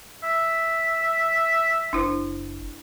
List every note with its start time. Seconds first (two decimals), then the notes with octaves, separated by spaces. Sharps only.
0.23 E5
1.93 F#1 D4 E4 C5